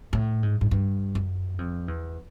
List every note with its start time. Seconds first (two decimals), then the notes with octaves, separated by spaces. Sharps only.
0.13 A2
0.43 G#2
0.61 G#2
0.71 G2
1.15 F#2
1.58 F2
1.88 E2